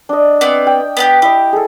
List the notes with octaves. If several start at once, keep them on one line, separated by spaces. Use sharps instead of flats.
D4 D#5
B3 C4 D5
G5
B3 D4 G4
E4 G4 D#5
G#4 A4